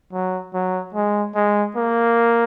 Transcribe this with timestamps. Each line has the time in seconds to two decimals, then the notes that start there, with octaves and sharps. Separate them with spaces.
0.13 F#3
0.54 F#3
0.95 G#3
1.35 G#3
1.76 A#3